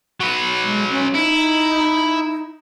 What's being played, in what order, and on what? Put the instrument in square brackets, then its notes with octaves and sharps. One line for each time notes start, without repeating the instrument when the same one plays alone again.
[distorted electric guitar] F#3 B4
[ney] G#3
C#4
[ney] D#4 [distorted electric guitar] E4